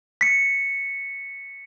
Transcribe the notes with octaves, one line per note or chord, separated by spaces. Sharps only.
B6 C#7